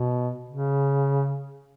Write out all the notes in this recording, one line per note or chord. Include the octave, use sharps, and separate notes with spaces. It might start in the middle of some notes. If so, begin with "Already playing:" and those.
Already playing: B2
C#3